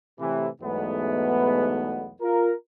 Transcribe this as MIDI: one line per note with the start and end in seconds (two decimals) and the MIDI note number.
0.20 0.47 45
0.20 0.47 48
0.20 0.47 52
0.62 2.12 35
0.62 2.12 40
0.62 2.12 44
0.62 2.12 47
0.62 2.12 57
0.62 2.12 59
2.22 2.53 65
2.22 2.53 70